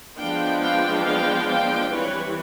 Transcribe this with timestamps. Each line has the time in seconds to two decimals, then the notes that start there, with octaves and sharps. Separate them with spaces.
0.18 F3 G#3 B3 D4 F5 G5
0.61 F5 G5
1.04 F5 G5
1.48 F5 G5
1.91 E3 G3 C4 B4 C#5